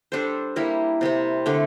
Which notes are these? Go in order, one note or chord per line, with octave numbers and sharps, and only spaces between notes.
G3 D4 A4 C5
G3 A#3 E4 A#4
C3 G3 C4
D3 A3 D4 A4